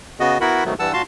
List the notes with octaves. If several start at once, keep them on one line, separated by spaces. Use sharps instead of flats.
C#3 B3 F#4 D#5
B3 E4 F#4 A#4 F#5 B5
G#2 B2 D#3 F#3 A3 B3
G2 E3 G3 F#5 A5 E6
A#2 F#4 F5 A5 C6